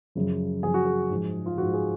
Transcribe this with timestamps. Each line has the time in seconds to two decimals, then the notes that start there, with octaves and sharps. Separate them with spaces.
0.15 F#2 C#3 F3
0.63 F#2 C#3 F3 G#4
0.74 F#4
0.86 G#4
1.10 G#2 F3
1.46 F4
1.58 G#2 F3 F#4
1.74 G#4